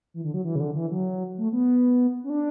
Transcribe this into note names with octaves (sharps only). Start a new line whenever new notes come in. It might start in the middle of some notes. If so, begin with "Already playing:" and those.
E3
D3
F#3
E3
C#3
D3
E3
F#3
A3
B3
C#4
D4